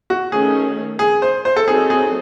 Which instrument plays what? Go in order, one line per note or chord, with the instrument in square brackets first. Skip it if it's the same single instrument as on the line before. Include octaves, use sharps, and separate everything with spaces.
[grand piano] F#4
[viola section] D#3 A3 C#4 [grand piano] G#4
[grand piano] G#4
C5
C5
A4
[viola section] F#3 C4 D#4 A4 [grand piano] G#4
[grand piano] G#4